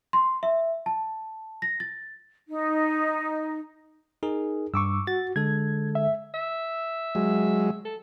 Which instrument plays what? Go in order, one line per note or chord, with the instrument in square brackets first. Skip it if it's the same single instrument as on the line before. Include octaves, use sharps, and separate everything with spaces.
[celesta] C6
E5
A5
A#6
A6
[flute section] D#4
[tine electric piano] D#4 G#4 A#4
[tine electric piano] G2 [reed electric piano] C#6 D6 E6
[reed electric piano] F#4 [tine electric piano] A6
[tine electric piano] D3 G#3 A4 [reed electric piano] G#6
[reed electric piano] E5
[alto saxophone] E5
[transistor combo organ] F#3 G#3
[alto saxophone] A4